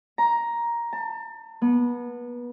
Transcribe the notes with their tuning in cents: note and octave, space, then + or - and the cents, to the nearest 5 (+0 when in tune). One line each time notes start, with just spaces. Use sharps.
A#5 +10
A5 +35
B3 -25